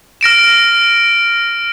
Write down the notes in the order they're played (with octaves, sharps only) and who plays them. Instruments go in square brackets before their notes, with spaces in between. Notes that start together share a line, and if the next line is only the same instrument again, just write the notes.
[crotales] F6 A#6 D7 E7